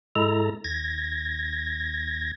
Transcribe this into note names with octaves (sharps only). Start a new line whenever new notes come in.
G#2 G#3 E4 A4 A#5
D#2 G#6 A#6